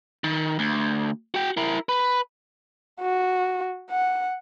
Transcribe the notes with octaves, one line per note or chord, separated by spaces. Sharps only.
D#3
D2
F#4 G5
E4 A#4
B4
F#4
F#5